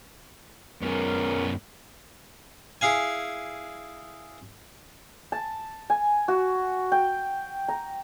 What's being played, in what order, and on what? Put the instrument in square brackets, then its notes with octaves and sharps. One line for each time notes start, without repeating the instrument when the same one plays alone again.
[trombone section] C#2 C#4 A#4 [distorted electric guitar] F#2 B3
[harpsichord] E4 G#4 F5 G#5
[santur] A5
G#5
F#4
G5
A#5